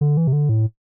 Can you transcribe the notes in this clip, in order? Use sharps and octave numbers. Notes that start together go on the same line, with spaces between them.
D3
E3
C3
D3
A2